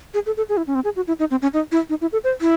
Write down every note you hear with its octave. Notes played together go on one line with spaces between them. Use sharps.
G#4
A4
A4
G#4
E4
C#4
C4
G#4
F#4
E4
D#4
C4
C#4
D#4
E4
D#4
E4
A4
C5
E4